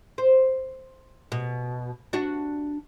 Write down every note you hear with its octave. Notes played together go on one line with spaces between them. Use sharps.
C5
B2
D4 F#4